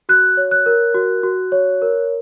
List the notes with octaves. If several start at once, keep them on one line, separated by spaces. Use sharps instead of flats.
F#4 F#6
C#5
F#6
A#4
F#4
F#4
C#5
A#4